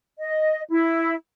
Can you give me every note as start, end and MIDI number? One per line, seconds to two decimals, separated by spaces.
0.19 0.61 75
0.69 1.14 64